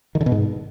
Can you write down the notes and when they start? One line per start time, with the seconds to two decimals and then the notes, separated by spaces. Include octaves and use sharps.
0.15 D#3
0.21 D3
0.26 B2
0.32 G#2